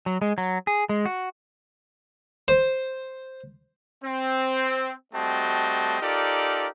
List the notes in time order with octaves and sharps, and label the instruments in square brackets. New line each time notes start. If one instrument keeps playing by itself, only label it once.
[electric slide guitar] F#3
G#3
F#3
G#4
G#3
F#4
[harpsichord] C5
[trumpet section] C4
G3 A3 C4 F#4 D#5 A5
D#4 F4 G4 A4 A#4 D5